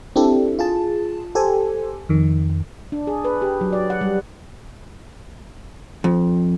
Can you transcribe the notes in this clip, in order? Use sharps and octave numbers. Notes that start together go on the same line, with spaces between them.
C4 D4 E4 G4 A4
F4 G#4 A5
G4 A4 C5 G#5
F2 D#3
D4
G#4
B4
G4
F#3
D5
F#5
G3
F2